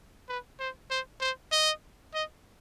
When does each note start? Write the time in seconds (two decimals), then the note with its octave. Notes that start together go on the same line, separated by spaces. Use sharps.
0.29 B4
0.60 C5
0.91 C5
1.21 C5
1.52 D#5
2.14 D#5